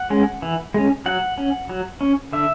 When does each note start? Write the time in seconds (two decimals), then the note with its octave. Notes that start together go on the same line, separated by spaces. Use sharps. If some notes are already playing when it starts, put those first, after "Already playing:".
Already playing: F#5
0.10 G#3 C#4
0.42 E3
0.74 G#3 C#4
1.06 F#3 F#5
1.38 C#4
1.69 F#3
2.01 C#4
2.33 D3 E5